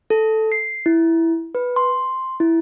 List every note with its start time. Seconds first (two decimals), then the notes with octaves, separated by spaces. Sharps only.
0.10 A4
0.52 C7
0.86 E4
1.55 B4
1.76 C6
2.40 E4